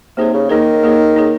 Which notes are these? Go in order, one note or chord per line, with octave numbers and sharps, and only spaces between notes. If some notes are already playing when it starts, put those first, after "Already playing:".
C3 A#3 D#4 G#4 C#5
C#3
D#3 A#3 D#4 G#4 C#5
A#3 D#4 G#4 C#5
A#3 D#4 G#4 C#5